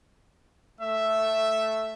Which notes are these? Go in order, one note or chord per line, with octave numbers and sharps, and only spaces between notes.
A3 E5